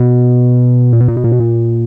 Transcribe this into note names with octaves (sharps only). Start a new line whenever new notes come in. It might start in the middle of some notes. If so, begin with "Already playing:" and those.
Already playing: B2
A#2
B2
A#2
B2
A#2
B2
A#2